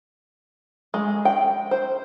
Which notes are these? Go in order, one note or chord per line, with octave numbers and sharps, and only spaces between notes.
G#3
G5
C5